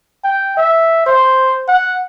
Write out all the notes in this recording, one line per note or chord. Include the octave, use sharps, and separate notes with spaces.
G5
E5
C5
F#5